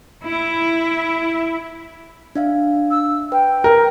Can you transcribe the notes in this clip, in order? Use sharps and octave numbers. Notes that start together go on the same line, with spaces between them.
E4
D4 E5 F5
E6
B4 G5
A#4